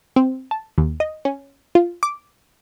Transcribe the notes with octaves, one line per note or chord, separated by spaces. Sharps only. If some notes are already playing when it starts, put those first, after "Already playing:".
C4
A5
D#2
D#5
C#4
F4
D6